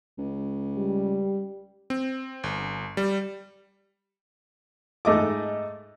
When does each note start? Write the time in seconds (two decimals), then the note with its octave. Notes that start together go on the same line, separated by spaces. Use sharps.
0.18 C#2
0.77 G3
1.90 C4
2.44 G1
2.97 G3
5.05 G#2 A3 D#5 D6